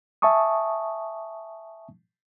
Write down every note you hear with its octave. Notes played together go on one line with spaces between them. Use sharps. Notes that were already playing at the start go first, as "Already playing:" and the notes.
E5 G#5 A5 C#6 D#6